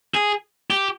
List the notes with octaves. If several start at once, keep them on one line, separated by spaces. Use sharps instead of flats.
G#4
G4